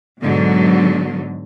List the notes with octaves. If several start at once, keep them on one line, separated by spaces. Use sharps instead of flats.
G#2 B2 D3 F#3